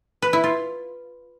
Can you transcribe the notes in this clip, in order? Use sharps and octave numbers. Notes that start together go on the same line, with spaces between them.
B4
E4
F4